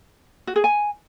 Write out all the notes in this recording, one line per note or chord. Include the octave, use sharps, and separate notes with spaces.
F#4
G#4
G#5